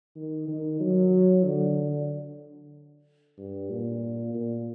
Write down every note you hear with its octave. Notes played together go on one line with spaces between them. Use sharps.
D#3
D#3
F#3
D3
G2
A#2
A#2